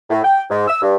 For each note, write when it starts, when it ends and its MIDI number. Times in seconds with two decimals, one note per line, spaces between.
0.10 0.19 45
0.24 0.43 79
0.50 0.64 44
0.68 0.80 88
0.82 0.96 43